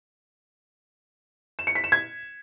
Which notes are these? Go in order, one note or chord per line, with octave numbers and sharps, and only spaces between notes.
E7
C#7
B6
E7
G#6